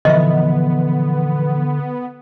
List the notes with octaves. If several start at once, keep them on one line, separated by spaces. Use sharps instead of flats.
A#2 D3 E3 F3 B3 D#5 E5